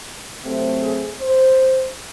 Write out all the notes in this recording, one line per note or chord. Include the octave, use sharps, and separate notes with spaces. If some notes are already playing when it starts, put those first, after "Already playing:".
C3 F#3 A3 C4
G#4
C5